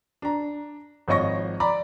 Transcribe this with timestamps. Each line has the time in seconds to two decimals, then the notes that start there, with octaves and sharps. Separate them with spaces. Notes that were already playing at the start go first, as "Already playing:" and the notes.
0.22 D4 A#5
1.08 G#1 F3 C#5 D#5 C#6 A#6
1.60 D5 A#5 B5 D6